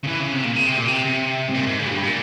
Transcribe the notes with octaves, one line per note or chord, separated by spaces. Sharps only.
C#3
E3
C#3
C3
A#2
C#3
C3
A#2
C3
C3
G#2
A#2
G#2
C#3
G2
A#2